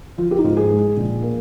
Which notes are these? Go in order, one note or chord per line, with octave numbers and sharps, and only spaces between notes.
F3 F4
G4
D#4
G#2 F4
G#4
G#3
A#1
A#3